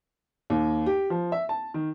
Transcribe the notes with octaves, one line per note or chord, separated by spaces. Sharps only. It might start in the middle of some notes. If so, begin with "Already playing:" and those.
D#2
G4
F3
E5
A5
D#3